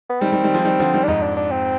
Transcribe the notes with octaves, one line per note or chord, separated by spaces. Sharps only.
B3
D#3 G3 C4
D#3 G3
D#3 G3
F3 G#3
D#3 G3
D3 F3
D#3 G3
D4
F2 G#2 D#4
D4
D4
C4